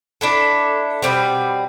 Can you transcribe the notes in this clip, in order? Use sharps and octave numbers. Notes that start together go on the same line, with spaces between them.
D4 E4 A4
B2 D3 G3 C4